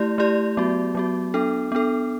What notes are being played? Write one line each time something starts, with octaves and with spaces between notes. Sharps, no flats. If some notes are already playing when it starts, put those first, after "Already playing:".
Already playing: A3 E4 G4 D5
A3 E4 G4 D5
F#3 B3 F#4
F#3 B3 F#4
B3 D4 A4
B3 D4 A4